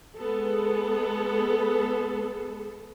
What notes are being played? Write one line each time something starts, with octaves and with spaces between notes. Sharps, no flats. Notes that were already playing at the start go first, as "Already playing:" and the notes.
G#3 B3 A4